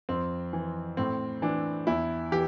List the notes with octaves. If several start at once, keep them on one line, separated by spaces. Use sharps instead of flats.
F2 C4
E3
A2 C4
E3 D4
E2 E4
E3 G4